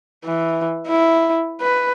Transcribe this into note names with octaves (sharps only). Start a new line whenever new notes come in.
E3
E4
B4